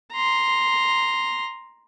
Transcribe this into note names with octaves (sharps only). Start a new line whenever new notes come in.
A#5 C6